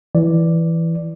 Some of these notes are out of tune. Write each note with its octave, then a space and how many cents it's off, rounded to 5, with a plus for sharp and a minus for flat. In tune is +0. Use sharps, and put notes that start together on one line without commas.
E3 +0 D5 +0